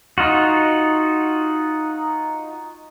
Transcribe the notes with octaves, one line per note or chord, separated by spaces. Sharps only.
D#4 F4 F#4